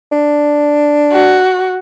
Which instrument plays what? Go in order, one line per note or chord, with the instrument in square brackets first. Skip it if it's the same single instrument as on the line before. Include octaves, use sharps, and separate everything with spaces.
[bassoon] D4
[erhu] F#4